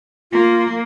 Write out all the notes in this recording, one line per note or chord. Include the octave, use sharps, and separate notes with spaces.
A#3 F4